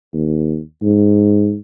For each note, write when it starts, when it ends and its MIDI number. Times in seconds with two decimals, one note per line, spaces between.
0.13 0.61 39
0.82 1.57 44